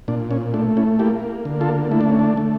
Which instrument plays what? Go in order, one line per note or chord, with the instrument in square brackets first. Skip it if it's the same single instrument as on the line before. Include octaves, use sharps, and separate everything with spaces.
[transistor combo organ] A#2 D4
C#4
A3 D4
C#4 E4
A#3 E4 G4
D3
F4 A4
A3 E4
D4
C#4
D4
A3